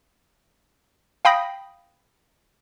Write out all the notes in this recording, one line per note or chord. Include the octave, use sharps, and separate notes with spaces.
F5 G5 B5 D#6 A#6